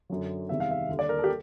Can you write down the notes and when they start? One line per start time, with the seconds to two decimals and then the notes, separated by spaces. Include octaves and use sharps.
0.10 F#2 D3 F#3
0.49 E2 C3 D#3 G3 E5
0.60 F5
0.71 E5
0.89 D#2 D3 G3
0.99 D5
1.09 A#4
1.19 A4
1.24 G4